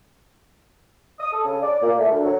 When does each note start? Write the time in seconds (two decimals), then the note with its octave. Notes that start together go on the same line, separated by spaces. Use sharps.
1.20 D#6
1.33 A4
1.44 C#3
1.61 D5
1.82 A#2
1.98 A3
2.11 D2
2.25 F#3